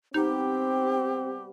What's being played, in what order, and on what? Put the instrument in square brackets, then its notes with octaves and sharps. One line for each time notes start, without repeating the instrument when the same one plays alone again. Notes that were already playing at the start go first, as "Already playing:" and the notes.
[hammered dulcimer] C3 G3 B3 [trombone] C4 [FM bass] D#4 [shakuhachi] G4